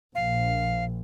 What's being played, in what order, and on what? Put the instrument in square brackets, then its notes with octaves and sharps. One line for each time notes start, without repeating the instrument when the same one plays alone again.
[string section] A#1 [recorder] F5